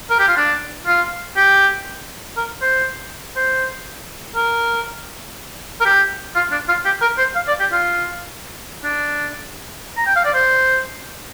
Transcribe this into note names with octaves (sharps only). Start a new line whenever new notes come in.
A#4
G4
F4
D4
F4
G4
A#4
C5
C5
A#4
A#4
G4
F4
D4
F4
G4
A#4
C5
F5
D5
G4
F4
D4
A#5
G5
F5
D5
C5